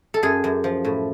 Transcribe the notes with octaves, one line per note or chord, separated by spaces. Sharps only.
A4
F#2 G#4
F#2
F3
A2